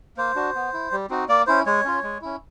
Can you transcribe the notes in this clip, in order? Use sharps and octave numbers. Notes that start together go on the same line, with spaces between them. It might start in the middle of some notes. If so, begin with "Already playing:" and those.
A#3 C5
D4 F#4
B3
E4
G3
C4 D#4 F#4
A#3 D5
C#4 E4 C5
G#3 C#5
C#4 F4
G#3
C#4 E4